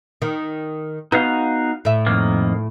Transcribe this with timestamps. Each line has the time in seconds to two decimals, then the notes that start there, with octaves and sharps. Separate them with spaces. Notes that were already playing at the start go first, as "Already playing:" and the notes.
0.22 D#3
1.12 B3 D#4 F#4 F5
1.85 A2 E5
2.07 F2 D#3 A#3